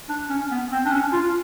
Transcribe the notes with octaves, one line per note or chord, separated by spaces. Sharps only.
D4
C#4
B3
C4
D4
C#4
F4